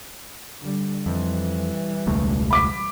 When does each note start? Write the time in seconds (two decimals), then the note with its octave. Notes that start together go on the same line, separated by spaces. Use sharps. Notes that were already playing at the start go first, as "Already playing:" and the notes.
0.60 D3 G3
1.06 F2 E3 G3
2.07 E1 C#2 A3
2.51 B5 D6 B6